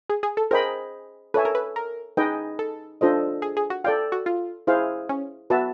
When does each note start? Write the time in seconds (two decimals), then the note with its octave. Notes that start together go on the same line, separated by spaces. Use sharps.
0.10 G#4
0.23 G#4
0.37 A4
0.51 G#4 A#4 C5 D#5 G5 B5
1.34 A4 B4 C#5 E5 G#5
1.45 A#4
1.55 B4
1.76 A#4
2.17 D#4 G#4 B4 D#5 G5
2.59 A4
3.01 D4 F4 A4 C5 D#5
3.42 G#4
3.57 G#4
3.70 F#4
3.84 F4 A4 D5 G5
4.12 F#4
4.26 F4
4.67 E4 G#4 C5 F5
5.09 C#4
5.50 B3 F#4 B4 E5 A5